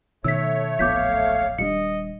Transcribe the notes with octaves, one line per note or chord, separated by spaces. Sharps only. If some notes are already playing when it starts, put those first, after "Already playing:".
B2 D#3 A3 C#5 E6 B6
D1 A#1 B3 F5 D6 G6 B6
D#1 G3 D4 D#5 C#7